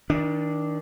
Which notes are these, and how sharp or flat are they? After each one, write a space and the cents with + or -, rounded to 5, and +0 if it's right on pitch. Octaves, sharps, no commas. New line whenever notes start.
D#3 +30 D4 +0